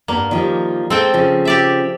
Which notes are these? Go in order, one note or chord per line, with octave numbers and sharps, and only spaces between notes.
G2 A#3 B3
D#3 F3 G3
G#3 C4 A4 G5
C#3 F3
G4 D5 E5